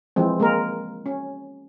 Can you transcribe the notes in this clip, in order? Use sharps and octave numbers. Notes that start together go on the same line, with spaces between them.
E3 F3 G#3 C4
G#3 A#3 A#4
C#4